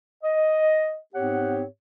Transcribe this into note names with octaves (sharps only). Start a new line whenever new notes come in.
D#5
G#2 B3 C4 G4 C#5 F#5